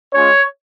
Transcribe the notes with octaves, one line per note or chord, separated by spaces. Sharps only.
G#3 C#4 F4 C#5